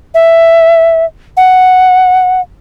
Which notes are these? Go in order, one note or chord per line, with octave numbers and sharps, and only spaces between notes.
E5
F#5